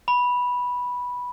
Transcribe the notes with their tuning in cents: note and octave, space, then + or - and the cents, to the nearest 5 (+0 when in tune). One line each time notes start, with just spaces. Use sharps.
B5 -10